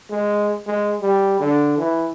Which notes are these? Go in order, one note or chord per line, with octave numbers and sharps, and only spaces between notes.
G#3
G#3
G3
D3
E3